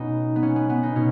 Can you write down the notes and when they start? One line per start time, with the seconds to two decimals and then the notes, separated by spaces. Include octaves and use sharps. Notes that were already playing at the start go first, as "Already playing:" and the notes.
Already playing: B2 B3 C#4 D#4
0.36 B3
0.43 C#4
0.56 B3
0.70 B3
0.83 D#4
0.95 B2 C#4